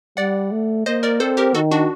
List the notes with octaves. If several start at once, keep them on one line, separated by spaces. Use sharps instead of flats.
G3 D5 F#5
A3
A#3 C5 D#5
A#4 D5
C4 A4 C5
G4 A#4
D#3 F#4 A4
D4 F#4